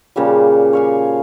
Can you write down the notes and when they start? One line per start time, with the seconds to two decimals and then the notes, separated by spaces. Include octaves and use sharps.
0.16 A#2 C#3 F3 G3
0.73 C#5 F5 G#5